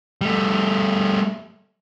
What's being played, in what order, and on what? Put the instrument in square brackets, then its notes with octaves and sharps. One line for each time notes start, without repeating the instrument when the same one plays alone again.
[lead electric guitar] G3 A3